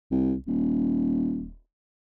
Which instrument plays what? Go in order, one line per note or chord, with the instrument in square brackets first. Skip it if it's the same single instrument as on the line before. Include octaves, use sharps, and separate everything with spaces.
[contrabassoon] C2
D#1